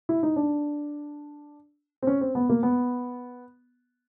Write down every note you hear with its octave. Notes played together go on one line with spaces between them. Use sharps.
E4
D#4
D4
C4
C#4
C4
B3
A#3
B3